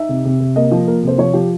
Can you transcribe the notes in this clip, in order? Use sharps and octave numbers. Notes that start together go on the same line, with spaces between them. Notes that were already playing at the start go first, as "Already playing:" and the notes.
Already playing: D#4 E5
C3
C3
C3
A#3 D#5
F3
A#3 A#4
C3 C5
F3 C#5
F3 G4